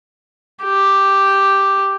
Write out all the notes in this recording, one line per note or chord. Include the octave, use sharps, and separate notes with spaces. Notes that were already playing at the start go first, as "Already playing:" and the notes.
G4